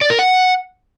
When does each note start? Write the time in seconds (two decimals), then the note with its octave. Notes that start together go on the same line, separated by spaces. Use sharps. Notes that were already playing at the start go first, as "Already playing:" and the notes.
0.01 D5
0.10 A#4
0.19 F#5